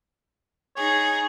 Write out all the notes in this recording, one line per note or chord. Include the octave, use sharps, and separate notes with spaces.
D#4 G#4 C#5